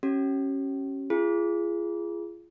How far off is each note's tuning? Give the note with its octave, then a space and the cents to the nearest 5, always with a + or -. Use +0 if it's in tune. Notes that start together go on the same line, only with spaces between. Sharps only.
C#4 -20 G4 -45
F4 -35 G#4 +0